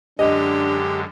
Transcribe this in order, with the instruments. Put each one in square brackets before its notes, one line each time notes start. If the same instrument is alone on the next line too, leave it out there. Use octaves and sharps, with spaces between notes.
[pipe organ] F#2 D3 G#3 [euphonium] D4 [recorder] G4 [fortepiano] D#5